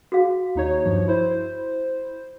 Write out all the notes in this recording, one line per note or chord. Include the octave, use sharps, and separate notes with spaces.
F#4 G#4 F5
D#2 D#4 C#5
G2 F3 C#5
E4 C5